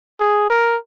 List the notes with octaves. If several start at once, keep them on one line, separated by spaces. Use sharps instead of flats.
G#4
A#4